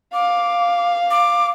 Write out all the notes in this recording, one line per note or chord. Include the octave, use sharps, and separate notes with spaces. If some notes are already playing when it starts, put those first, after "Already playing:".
F5 D6
D6